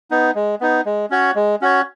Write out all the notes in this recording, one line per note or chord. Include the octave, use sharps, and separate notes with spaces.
B3 D#4
G#3
B3 D#4
G#3
C#4 F#4 C#5
G#3
C#4 F#4 C#5